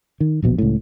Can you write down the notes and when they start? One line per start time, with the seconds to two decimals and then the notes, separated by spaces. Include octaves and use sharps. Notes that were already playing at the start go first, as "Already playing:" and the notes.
0.20 D#3
0.42 D1 A#1 B2
0.58 C#2 A2